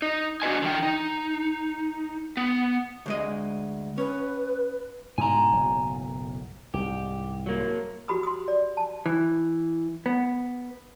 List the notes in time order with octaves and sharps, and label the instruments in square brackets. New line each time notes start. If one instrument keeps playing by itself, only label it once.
[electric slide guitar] D#4
D4 F#4 B4 D#5 G#5
D3 E3 G5
D#4
B3
[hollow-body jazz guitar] D2 G#3 D#5
[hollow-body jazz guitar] C#4 [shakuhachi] B4
[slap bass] G#2 B2 D3 [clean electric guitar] G#5 A#5
[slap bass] F#1 B1 A2
[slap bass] C2 G#2 [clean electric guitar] G4
[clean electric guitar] F#3 A#3
[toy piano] F#4 G4 B5 D#6
C6 D#6
D5
A5
[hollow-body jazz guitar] E3
B3